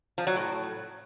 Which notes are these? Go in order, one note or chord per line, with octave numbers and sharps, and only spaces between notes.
F3
F#3
A2